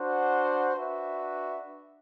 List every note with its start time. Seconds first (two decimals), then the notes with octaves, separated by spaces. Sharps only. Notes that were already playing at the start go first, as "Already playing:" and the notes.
Already playing: D4 F#4 C5 F#5
0.76 D4 F#4 B4 E5